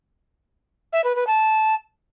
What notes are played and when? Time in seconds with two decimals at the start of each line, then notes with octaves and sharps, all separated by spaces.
0.93 E5
1.04 B4
1.16 B4
1.27 A5